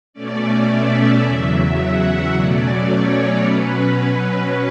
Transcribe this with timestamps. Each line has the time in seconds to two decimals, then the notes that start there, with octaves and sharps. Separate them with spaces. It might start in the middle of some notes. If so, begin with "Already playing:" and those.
0.13 B2 A3 C#4 D5
0.69 E5
1.23 E2 C#3 F#3 E5
1.79 F#5
2.34 B2 F#3 A3 C#4 D5
2.89 C#5
3.44 B2 F#3 C#4 B4